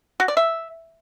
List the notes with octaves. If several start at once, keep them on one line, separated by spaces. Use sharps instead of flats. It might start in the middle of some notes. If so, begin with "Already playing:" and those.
F#4
D5
E5